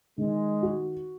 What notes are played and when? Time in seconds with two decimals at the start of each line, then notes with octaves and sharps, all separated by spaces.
0.18 D#3 G#3
0.63 F#4